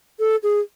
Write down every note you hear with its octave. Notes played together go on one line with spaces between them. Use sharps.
A4
G#4